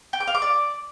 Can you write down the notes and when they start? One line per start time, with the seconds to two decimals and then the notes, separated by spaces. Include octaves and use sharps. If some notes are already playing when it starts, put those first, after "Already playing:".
0.13 G5
0.20 D6
0.27 F5
0.35 D6
0.42 D5